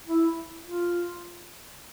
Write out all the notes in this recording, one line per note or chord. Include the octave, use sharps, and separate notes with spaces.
E4
F4